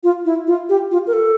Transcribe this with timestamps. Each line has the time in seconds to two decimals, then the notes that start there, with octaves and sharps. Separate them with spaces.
0.04 F4
0.25 E4
0.47 F4
0.69 G4
0.91 F4
1.07 A#4
1.13 A4